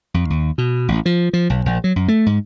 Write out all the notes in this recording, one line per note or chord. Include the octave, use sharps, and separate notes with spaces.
F2
D#2
B2
A1
F3
F3
B1
A#1
F#3
F#2
A3
G#2